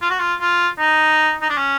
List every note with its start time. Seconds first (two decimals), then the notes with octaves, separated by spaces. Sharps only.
0.01 F4
0.10 F#4
0.19 F4
0.40 F4
0.79 D#4
1.42 D#4
1.49 D4
1.57 C#4